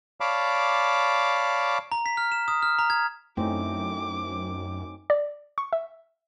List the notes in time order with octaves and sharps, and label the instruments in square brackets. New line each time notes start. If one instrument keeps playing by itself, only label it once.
[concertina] C#5 D5 F5 A5 B5 D6
[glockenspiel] A#5
B6
F6
E7
D#6
F6
A#5
G#6
[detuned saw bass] F#2 [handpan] A3 E4 [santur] C4 C#4 D#4 [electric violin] D6
[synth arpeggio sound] D5
C#6
E5